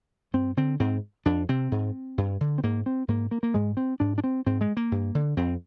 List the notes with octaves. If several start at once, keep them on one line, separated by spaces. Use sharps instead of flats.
G2 C4
D3 C4
G#2 C4
F2 D4
C3 C4
G#2
G2
D3
C4
G#2 A#3
C4
G#2 A#3
A#3
A#3
G#2 G#3
C4
G#2 D4
D4
C4
G#2 C4
G#3
A#3
G2
D3
F2 C4